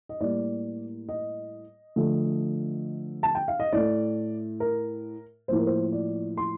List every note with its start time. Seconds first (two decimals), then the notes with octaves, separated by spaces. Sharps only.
0.09 D#5
0.21 A2 G3 A#3 D5
1.09 D#5
1.96 D3 F3 A3
3.23 A5
3.35 G5
3.48 F5
3.60 D#5
3.73 A2 A3 D5
4.60 A#4
5.48 A2 F3 A#3 C5
5.58 A#4
5.67 C5
5.92 D5
6.37 C6